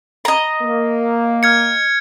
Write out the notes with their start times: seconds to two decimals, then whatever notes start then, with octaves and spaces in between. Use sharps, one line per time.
0.25 D#5 A#5
0.63 A#3
1.43 F6 G#6 C#7